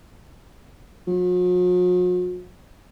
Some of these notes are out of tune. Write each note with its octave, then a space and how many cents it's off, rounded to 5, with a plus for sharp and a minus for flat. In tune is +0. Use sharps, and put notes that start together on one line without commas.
F#3 -45